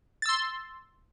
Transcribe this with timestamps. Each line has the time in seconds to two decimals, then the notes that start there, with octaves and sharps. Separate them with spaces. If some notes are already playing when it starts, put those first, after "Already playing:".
0.22 A6
0.26 E6
0.29 C6